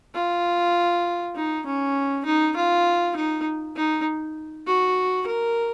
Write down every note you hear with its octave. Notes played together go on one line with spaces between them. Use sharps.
F4
D#4
C#4
D#4
F4
D#4
D#4
F#4
A#4